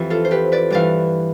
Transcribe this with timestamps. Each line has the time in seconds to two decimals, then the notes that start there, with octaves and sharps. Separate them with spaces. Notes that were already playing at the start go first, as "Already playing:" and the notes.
Already playing: F2 E3 G4 B4
0.10 F4 A4
0.25 C5
0.31 G4 B4
0.52 B4 D5
0.70 G2 E3 D5 F5